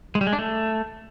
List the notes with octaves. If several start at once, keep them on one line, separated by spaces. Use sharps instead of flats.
G#3
G3
G#3
D4
A3